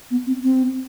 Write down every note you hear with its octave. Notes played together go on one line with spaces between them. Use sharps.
B3
C4
C4